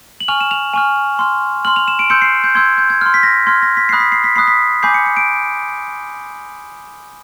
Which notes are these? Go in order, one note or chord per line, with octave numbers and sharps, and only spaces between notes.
F#7
G#5 C#6 F6 F7
E7
F7
G#5 C#6 F6
C6 F6
C6 F6 F#7
F7
E7
D7
C6 E6 G6 C#7
C7
G6
C6 E6 G6 G#6
G6
G#6
C6 F6
B6
A#6
C6 F6 G#6
A#6
B6
B5 D#6 F#6 C7
B6
C7
B6
B5 D#6 F#6 C7
B6
G#5 B5 D6 G6 C7
C#7
C#7
D7